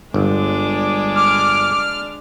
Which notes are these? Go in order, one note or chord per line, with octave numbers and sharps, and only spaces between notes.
G1 G#3 D4 D5
D6 F6